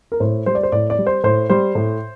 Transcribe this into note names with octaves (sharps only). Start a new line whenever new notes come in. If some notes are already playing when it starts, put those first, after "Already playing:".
A#4
A2 C5
G3 C5
D5
C5
A2 D5
D5
G3
C5
A2 C5
G3 C5
A2